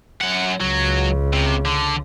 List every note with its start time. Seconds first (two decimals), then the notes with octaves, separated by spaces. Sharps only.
0.21 F#2 F#5
0.61 C#2 C#3 F#3
1.33 C3
1.65 D3